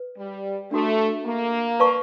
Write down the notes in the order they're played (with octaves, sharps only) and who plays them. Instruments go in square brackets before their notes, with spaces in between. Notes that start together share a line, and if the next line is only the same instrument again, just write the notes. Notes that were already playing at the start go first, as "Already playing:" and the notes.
Already playing: [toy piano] B4
[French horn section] G3
[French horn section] A3 [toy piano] D4 F#4 A4
[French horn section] A#3
[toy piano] B4 D5 F5 A5 C#6